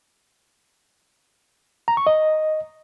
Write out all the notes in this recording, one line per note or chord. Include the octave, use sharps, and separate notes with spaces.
A#5
C#6
D#5